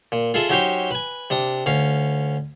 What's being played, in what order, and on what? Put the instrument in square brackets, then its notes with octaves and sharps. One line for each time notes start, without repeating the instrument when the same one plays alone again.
[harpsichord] A#2
F4 G#4 A4 D#5 E5
F#3 C#4 D#4 G4 C5 C#5
B4 G#5
C3 D4 D#6
D2 C#4 F5